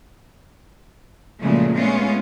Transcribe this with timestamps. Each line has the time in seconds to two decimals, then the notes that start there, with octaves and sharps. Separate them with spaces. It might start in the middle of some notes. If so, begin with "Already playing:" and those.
1.40 A#2 C#3 F3 F#3 G#3 A3
1.75 G#3 A3 B3 C#4 F4